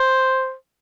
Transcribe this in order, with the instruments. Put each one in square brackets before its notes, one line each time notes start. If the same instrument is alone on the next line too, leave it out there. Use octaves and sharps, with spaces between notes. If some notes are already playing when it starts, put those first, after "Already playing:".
Already playing: [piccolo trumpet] C5